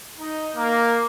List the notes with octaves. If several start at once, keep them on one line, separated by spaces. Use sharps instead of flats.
D#4
A#3